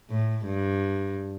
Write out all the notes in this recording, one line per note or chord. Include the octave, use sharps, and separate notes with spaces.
A2
G2